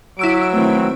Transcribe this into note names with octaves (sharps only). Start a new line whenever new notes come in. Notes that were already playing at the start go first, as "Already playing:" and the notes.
F#3 E4 D6 E6 D7
D#3 E3 A3 C4